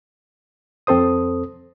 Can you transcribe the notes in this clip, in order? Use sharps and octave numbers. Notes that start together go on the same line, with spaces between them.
F2 C4 A4 C5 D#6